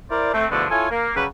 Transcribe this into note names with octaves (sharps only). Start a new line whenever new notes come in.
E4 A#4 C5 D5
A3 C4
E2 B2 D3 F3 A3 D4
E4 F4 A4 C#5 G#5
A#3
C#3 F#3 G3 F#4 B4